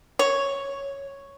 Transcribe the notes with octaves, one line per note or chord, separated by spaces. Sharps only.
C#5